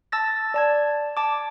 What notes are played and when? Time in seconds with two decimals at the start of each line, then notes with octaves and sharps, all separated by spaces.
0.12 A5 E6 A6 A#6
0.54 D5 A5 G#6
1.17 A5 D6